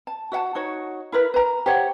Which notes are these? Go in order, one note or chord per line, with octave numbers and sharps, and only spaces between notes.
A5
F#4 E5 F#5 A5
D#4 F#4 C#5
E4 A#4 B4 B5
B4 A#5
G4 C5 C#5 F#5